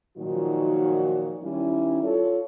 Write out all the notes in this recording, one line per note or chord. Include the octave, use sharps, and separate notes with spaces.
A#2 D#3 F3 F#3 D#4 F#4
D#3 G3 C#4 E4
F4 A4 C#5